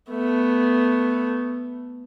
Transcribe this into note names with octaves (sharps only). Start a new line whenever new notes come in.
A3 B3